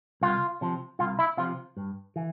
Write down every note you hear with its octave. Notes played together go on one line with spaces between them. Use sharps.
C2 F4
C3 F3
C2 F4
E4
C3 F3 F4
G2
E3